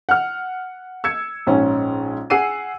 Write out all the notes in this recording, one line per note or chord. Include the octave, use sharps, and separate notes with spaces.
F#5 F6
E6 G#6 C#7
A#1 G#2 C#4
G#4 F#5 E6 C7 D#7